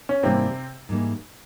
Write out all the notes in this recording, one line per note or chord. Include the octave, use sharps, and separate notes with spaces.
C#4
G#2 C3 E3 G3 A#3 C4 D#4
G#2 E3 G3 A#3 D#4